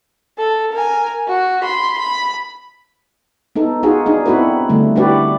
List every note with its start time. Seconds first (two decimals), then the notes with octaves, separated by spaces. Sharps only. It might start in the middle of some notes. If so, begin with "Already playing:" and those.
0.38 A4
0.73 A#4 G#5
1.28 F#4
1.63 B5 C6
1.98 B5
3.56 B3 D#4 A4
3.83 D#4 F4 F#4 G#4
4.06 D4 D#4 G#4
4.26 B3 C4 E4 F#4 A4 B4
4.69 D3 G3 A3
4.96 D4 E4 F#4 G4 B4 D5